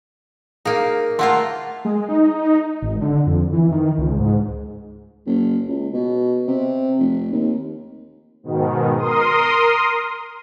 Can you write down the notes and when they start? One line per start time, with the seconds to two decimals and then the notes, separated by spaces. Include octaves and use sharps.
0.65 A#3 D#4 G#4 F5
1.19 A3 A#3 F4 F#5 C6
1.85 G#3
2.09 D#4
2.82 G#1
3.01 D3
3.26 F2
3.52 E3
3.71 D#3
3.98 C#2
4.19 G#2
5.27 F#1
5.68 C#2
5.94 B2
6.48 C3
6.99 F1
7.32 D#2
8.43 G#2 B2 D#3
8.98 A#4 C6 D#6